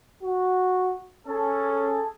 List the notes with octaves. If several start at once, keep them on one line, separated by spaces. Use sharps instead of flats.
F#4
C#4 G#4 A4